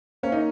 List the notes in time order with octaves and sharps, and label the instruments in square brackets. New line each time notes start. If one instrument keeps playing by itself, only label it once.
[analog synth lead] A#3 [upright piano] C#4
[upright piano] D#4